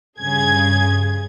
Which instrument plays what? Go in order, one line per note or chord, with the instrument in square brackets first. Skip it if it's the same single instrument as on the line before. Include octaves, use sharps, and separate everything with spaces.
[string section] G2 C#3 G#4 G#6